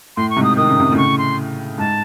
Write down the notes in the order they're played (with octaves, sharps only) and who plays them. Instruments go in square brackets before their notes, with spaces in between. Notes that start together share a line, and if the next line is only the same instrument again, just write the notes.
[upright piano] A2 [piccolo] C6
[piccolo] C#6
[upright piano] G#2 C3
[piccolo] D#6
[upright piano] D#3 [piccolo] D#6
[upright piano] C#3
C3
A2 C#3
[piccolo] C#6
C6
[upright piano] G#2 [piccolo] A5